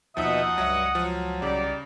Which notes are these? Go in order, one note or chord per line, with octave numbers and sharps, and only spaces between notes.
D#2 B2 F3 D#4 D#5 E5 F#5 D#6
C#2 G2 F#3 E5
F3 F#3
C2 C#3 D#4 G4 D5